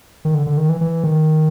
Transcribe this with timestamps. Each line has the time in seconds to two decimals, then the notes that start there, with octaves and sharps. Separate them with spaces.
0.25 D#3
0.34 D3
0.47 D3
0.57 D#3
0.69 E3
0.81 E3
1.04 D#3